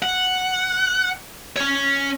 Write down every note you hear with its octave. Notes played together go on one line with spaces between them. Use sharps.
F#5
C#4 C#5